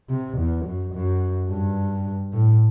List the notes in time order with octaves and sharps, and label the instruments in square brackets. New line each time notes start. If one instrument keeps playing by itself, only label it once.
[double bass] C3
E2
F#2
F#2
G2
A2